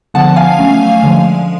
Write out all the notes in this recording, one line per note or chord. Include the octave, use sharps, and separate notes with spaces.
D3 F3 B3 F#5 A5
F5 G#5
F#3 A3 C#4
D3 F3 G#3